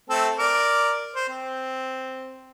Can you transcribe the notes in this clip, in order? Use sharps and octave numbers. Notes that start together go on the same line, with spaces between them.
A3 C4 A4
A#4 D5 D6
C5
C4